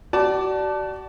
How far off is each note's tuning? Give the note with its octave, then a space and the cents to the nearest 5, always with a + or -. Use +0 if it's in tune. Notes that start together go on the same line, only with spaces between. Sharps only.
F#4 +40 D5 +0 A5 +0